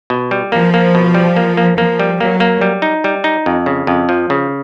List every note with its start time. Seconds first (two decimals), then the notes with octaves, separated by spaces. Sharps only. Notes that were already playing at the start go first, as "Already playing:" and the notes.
0.10 B2
0.31 G3
0.52 F3 A#3
0.74 A#3
0.95 B2
1.15 G3
1.36 A#3
1.57 A#3
1.78 F3 A#3
2.00 G3
2.20 F#3 A#3
2.40 A#3
2.61 G3
2.82 D#4
3.04 G3
3.24 D#4
3.46 F2
3.66 C#3
3.87 F2
4.09 F3
4.30 C#3